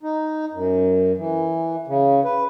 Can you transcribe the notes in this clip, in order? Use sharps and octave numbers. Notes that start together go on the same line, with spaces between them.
D#4
F#2
E3
C#3
B4